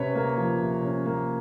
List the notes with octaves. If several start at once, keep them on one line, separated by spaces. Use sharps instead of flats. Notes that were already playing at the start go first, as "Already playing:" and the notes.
Already playing: C3 C#4 B4 C#5
A#3
F3
C3
C#4
A#3